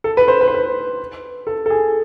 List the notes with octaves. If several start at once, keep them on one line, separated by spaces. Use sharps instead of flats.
A4
B4
C5
B4
C5
B4
A4
A4
G#4